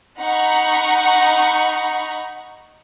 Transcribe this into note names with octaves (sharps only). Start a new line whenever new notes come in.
D#4 F#5 A#5 B5 C#6